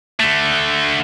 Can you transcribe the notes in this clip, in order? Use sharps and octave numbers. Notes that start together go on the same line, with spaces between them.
D3 A3